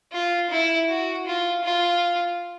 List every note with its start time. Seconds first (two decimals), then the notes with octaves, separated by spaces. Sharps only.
0.12 F4
0.50 E4
0.89 F#4
1.26 F4
1.64 F4